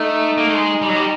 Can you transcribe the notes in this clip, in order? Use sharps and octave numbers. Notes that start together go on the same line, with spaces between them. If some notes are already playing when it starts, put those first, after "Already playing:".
Already playing: A3 D#4
A#3
A3
G#3
G3
F#3
G3